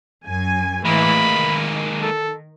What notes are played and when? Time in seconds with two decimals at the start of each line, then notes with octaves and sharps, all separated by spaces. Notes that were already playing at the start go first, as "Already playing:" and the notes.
0.24 F#2 G#5
0.85 A2 E3 G#3 A#3 B5
1.21 D#3
2.02 A4